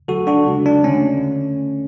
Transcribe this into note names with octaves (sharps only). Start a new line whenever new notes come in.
D3 F#3 A3 F#4 A4
D4 F#4
C#3 G#3
D4
D3 A3 C#4